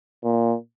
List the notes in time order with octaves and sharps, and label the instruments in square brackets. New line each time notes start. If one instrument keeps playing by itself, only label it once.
[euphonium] A#2